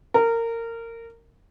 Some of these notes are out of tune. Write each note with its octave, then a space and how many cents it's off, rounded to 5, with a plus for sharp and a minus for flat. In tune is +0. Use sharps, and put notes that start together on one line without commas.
A#4 -20